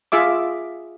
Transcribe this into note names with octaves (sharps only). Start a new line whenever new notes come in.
F4 G#4 E5 D6